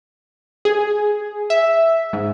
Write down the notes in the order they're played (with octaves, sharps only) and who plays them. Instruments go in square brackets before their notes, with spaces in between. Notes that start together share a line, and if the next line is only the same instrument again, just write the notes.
[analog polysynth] G#4
E5
G#2